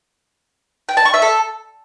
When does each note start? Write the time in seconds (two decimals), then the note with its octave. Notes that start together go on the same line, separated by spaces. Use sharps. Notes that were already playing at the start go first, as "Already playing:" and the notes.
0.89 G5
0.97 A5
1.05 C#6
1.14 E5
1.22 A4